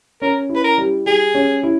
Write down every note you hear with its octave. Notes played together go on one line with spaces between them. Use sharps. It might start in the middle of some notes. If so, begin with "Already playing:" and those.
C#4 A#4
E4
B4
A#4
G3
G3 G#4
C#4
E4